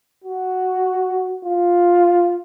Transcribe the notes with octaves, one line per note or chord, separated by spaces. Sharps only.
F#4
F4